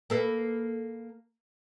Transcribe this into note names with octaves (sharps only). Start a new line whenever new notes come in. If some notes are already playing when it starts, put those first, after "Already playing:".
A#3 A4 B4